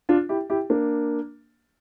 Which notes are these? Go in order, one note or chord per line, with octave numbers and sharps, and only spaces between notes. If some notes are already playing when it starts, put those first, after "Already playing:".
D4 F4
E4 G4
E4 G4
A#3 D4